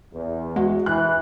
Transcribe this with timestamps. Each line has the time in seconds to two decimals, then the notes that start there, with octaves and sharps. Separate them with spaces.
0.14 E2
0.56 G#3 F#4
0.86 E3 F#6